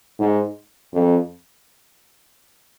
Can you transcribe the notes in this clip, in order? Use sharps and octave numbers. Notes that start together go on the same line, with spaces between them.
G#2
F2